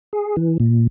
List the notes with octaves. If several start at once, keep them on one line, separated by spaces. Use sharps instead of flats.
G#4
E3
A#2